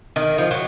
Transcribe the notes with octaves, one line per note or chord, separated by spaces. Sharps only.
D#3
F3
F#3